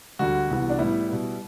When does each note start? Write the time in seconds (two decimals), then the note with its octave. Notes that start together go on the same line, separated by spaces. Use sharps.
0.19 D2 D3 G3 F#4
0.49 C2 C3 E3 B3
0.70 D4
0.79 A2 G3 B3 E4
1.09 B2 G3 B3